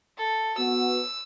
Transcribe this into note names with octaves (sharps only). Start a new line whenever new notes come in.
A4
B3 F#4 E6